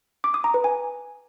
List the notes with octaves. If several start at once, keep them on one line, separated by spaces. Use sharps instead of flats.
D6
D#6
A#5
B4
G#5